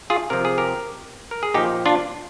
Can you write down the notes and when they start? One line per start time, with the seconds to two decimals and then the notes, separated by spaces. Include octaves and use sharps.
0.10 F4 G#4
0.30 C3 F3 A#4
0.45 G#4
0.58 G4 A#4
1.31 A#4
1.43 G#4
1.54 A#2 F3 D#4 G4
1.86 D4 F4